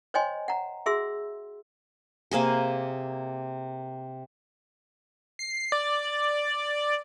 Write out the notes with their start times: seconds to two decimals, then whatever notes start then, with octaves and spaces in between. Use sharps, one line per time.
0.14 C5 C#5 D#5 G5 G#5 C6
0.48 F#5 A#5
0.86 F#4 G#4 E5 C6 E6
2.31 C3 A#3 G#4 C5
5.39 C7
5.72 D5